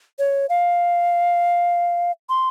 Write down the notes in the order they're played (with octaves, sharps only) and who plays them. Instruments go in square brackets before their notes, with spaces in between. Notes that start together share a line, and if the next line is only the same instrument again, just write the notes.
[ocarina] C#5
F5
C6